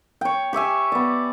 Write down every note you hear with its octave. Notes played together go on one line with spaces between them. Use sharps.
C#5 G5
G4 C#5 E5 G#5
B3 D5